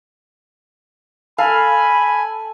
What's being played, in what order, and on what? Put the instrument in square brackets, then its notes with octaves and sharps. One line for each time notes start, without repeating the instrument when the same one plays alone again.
[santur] A4 [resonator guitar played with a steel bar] F5 [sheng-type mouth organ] G#5 [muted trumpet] B5